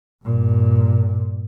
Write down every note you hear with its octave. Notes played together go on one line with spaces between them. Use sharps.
G2 A#2